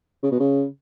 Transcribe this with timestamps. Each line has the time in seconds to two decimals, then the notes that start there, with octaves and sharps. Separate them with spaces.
0.23 C#3
0.31 B2
0.40 C#3